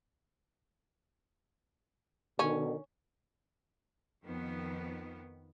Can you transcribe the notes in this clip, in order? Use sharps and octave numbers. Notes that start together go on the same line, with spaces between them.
B2 D3 D#3 C#4
F2 D#3 B3